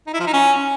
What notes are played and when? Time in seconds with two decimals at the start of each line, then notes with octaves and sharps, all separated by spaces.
0.07 D#4
0.14 E4
0.20 F3
0.27 D#4
0.34 C#4